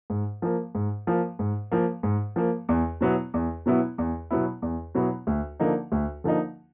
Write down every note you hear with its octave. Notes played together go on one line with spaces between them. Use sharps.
G#2
F3 A#3
G#2
F3 A#3
G#2
F3 A#3
G#2
F3 A#3
E2
B2 F#3 B3 E4
E2
B2 F#3 B3 E4
E2
B2 F#3 B3 E4
E2
B2 F#3 B3 E4
D2
D3 F3 A#3 D#4
D2
D3 F3 A#3 D#4